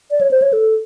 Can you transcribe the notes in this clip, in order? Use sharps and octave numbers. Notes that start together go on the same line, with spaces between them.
D5
C#5
C5
C#5
A4